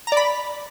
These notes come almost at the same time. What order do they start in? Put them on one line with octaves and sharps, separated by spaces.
A#5 D5 B5